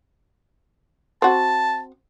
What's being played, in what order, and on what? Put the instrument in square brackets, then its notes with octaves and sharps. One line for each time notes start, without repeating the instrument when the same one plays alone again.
[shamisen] C4 F#4 [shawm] A5